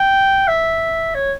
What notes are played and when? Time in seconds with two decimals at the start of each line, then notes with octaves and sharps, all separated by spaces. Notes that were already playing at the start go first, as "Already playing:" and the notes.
Already playing: G5
0.48 E5
1.15 C#5